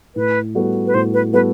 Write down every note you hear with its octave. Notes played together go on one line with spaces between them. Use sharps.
A2 B4
G3 B3 F#4 A4
B4
A2 C5
B4
G3 B3 F#4 A4 B4